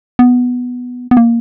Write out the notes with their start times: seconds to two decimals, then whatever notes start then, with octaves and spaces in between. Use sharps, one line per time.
0.19 B3
1.11 B3
1.17 A#3